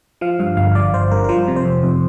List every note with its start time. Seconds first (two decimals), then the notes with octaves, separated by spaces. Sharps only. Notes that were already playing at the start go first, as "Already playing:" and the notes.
0.21 F3 F5
0.39 G2 F5
0.57 G1 F5
0.75 G1 D5
0.93 G1 C5
1.11 G2 A#4
1.24 A#4
1.29 F3 C5
1.48 C3
1.56 C5
1.65 F2
1.83 F2